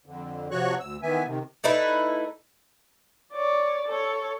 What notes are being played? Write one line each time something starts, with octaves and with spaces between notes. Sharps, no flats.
F2 D3
C3 F3 F#4 C#5 C#6 F#6
D2 E6
D#3 E3 B3 E5 G#5
C3 D#3
A3 D#4 E4 B4
C#5 D5
A4 C#5